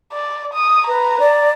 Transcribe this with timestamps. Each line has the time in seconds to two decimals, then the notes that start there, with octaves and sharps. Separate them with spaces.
0.13 D5
0.54 D#6
0.88 B4 A#5
1.19 D5